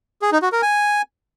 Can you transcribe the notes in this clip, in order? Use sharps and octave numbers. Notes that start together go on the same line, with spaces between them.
G#4
D#4
F#4
A#4
G#5